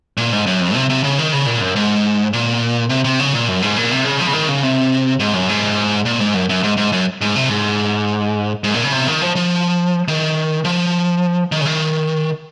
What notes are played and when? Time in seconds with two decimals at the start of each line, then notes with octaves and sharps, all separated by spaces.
0.17 A#2
0.32 G#2
0.46 F#2
0.61 F2
0.75 C3
0.89 C3
1.04 C#3
1.19 D#3
1.32 C#3
1.46 A#2
1.61 F#2
1.76 G#2
2.33 A#2
2.90 C3
3.04 C3
3.19 C#3
3.34 A#2
3.48 F#2
3.62 G#2
3.77 A#2
3.91 C3
4.04 C#3
4.20 F3
4.27 C#3
4.33 D#3
4.49 C#3
4.63 C3
5.20 G#2
5.34 F#2
5.49 G#2
6.05 A#2
6.20 G#2
6.34 F#2
6.49 F#2
6.63 G#2
6.77 G#2
6.92 F#2
7.21 G#2
7.36 C3
7.49 G#2
8.64 G#2
8.74 A#2
8.84 C#3
8.92 C3
9.07 D#3
9.22 F3
9.35 F3
10.08 D#3
10.65 F3
11.52 D#3
11.61 C#3
11.65 D#3